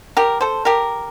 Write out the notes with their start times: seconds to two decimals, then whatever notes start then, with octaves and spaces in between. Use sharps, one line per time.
0.17 G4 A#4
0.41 A4 C5
0.65 G4 A#4